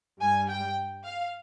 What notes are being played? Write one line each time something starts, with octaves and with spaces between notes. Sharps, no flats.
G2 G3 G#5
G5
F5